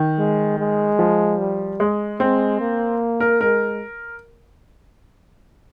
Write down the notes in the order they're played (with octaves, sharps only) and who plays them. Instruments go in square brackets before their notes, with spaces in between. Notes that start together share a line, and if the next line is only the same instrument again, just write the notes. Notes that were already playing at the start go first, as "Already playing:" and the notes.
Already playing: [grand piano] D#3
[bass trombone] G#3
G#3
[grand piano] F3
[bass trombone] G3
[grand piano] G#3
[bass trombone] G#3 [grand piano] C4
[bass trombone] A#3
[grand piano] A#4
[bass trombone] G#3 [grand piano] A#4